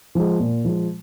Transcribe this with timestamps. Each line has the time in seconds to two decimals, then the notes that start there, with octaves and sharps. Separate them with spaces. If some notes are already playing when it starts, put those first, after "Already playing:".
0.15 F3 G#3
0.40 A#2
0.65 F3 G#3